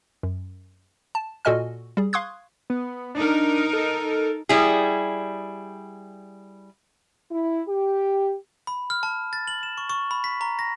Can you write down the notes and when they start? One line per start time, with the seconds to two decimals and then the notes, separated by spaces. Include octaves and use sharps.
0.23 F#2
1.15 A5
1.45 A#2 F#4 A4 D#5 G#5 F6
1.97 G3 G#4
2.13 F5 C6 C#6 D#6 F#6 G#6
2.70 B3
3.15 D4 D#4 A#4
3.73 A4
4.49 G3 E4 G#4
7.30 E4
7.67 G4
8.67 B5
8.90 F6
9.03 A5
9.33 A6
9.48 F#7
9.63 E7
9.78 C#6
9.89 C#6
10.11 B5
10.24 B6
10.41 A#5
10.59 A#6